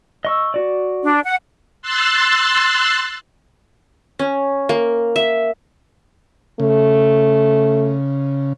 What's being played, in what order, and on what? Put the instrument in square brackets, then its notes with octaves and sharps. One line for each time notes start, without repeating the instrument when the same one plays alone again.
[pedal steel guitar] D#5 C#6 E6
F#4 D5
[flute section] D4
F#5
[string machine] C6 E6 F#6 A6
[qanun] C#4
A#3
E5
[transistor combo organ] C#3 [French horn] A3